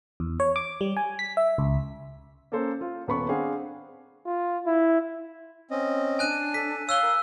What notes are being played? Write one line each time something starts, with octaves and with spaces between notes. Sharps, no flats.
E2
C#5
D6
G3
G#5
B6
E5
C#2
A#3 C#4 A4 C5
F4
D#1 B3 B5 C#6
C4 D4 G#4 F5 F#5
F4
E4
C4 C#4 D#5
D4 G#5 F#6 D#7
A4 B6
C#5 F5 E6 F#6 G7
A#4